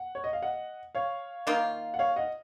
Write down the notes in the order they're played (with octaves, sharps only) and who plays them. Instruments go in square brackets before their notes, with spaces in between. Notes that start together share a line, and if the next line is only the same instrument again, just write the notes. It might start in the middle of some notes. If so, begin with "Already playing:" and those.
Already playing: [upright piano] F#5
C#5
D#5
F5
D#5 F#5
C#5 F5
[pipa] D#3 A#3 F4
[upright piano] F#5
C#5 F5
D#5 F#5